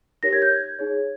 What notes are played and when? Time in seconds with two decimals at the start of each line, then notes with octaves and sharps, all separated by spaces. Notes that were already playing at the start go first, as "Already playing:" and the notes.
0.23 D#4 G4 A#4 C#5 A#6
0.33 G#6
0.42 G6
0.52 G#6
0.79 D#4 G#4 C#5